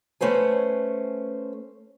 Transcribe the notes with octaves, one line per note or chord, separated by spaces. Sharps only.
A3 C#4 B4 C5 G#5